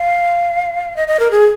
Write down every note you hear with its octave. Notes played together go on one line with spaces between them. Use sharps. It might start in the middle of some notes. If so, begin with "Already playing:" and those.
Already playing: F5
D#5
D#5
A#4
G#4